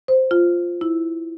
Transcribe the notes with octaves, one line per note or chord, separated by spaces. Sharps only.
C5
F4
E4